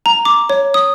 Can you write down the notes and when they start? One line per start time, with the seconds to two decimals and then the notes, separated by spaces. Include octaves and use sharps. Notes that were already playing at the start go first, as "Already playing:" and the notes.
0.06 A#5
0.25 D6
0.50 C#5
0.74 D#6